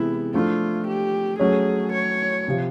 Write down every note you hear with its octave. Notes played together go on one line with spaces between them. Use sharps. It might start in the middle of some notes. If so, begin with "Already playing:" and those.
Already playing: C3 E3 G#3 B3 E4
F3 A3 D4 F4
G4
F#3 A3 C#4 G#4
C#5
C3 F3